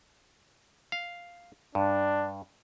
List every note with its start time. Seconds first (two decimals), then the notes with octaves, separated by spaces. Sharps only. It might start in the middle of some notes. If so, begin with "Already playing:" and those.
0.92 F5
1.75 G2 D4